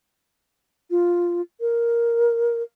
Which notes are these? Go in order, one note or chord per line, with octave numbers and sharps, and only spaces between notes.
F4
A#4